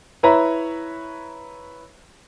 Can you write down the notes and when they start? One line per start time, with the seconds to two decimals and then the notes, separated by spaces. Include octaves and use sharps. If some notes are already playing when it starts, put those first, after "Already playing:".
0.23 E4 B4 C#5 E5 A#5